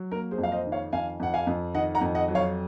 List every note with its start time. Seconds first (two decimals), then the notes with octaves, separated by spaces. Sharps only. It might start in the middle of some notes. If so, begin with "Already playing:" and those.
Already playing: F#3
0.11 A#3 A#4
0.31 G#4 C5
0.38 F2
0.43 F5
0.52 C5 D#5
0.66 D#3
0.72 C#5 F5
0.93 F2 F5 G#5
1.20 F2 F#5
1.34 F5 G#5
1.47 F2
1.74 D#3 D#5 F#5
1.95 F#5 A#5
2.01 F2
2.15 D#5 F#5
2.28 F#3
2.35 C#5 F5